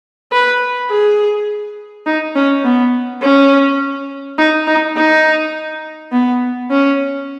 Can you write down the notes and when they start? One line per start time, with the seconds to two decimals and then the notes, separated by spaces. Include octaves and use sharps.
0.32 B4
0.90 G#4
2.06 D#4
2.35 C#4
2.64 B3
3.22 C#4
4.38 D#4
4.67 D#4
4.96 D#4
6.12 B3
6.71 C#4